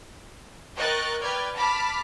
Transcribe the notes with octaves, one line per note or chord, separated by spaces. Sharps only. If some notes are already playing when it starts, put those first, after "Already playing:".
A#4 D#5 G5 C#6 F#6 A6
B4 D5 G5 F6 G#6
A5 B5 D6 F6 B6